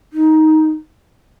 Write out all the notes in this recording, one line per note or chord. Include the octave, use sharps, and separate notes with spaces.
D#4